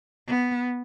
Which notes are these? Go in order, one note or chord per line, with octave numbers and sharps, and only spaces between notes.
B3